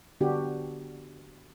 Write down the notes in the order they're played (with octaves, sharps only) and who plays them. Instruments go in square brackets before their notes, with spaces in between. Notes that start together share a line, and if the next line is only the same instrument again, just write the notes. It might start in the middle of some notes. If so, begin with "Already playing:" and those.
[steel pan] D3 B3 D4 F#4 G4